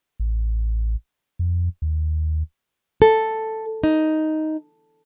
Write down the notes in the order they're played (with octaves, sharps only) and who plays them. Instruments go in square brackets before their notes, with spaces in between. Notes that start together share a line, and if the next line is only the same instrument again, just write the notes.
[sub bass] A1
F2
D#2
[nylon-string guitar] A4
D#4